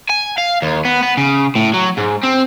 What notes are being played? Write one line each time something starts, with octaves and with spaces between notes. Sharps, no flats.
G#5
F5
D#2
B3
B3
C#3
A2
F#3
G#2
C4